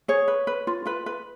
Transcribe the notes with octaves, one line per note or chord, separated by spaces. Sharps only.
G#4 C#5
B4
B4
F4
F4 B4
B4